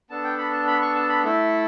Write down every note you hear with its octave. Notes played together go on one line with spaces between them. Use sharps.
B3 D4 A4 A5
G5
B5
A5
B5
C#6
A5
B5
A3 E4 A4